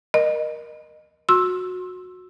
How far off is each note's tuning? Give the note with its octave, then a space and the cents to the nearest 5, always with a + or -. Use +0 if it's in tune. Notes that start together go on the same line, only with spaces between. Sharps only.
A#4 +20 D#5 -25
F#4 -20 C6 +30 E6 +0